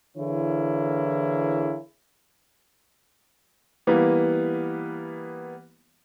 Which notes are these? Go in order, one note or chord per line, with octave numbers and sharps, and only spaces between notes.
D3 E3 A#3 E4 G#4 C#5
E3 G3 A#3 B3